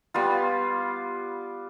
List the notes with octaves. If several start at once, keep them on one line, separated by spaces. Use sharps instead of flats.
G3 B3 F4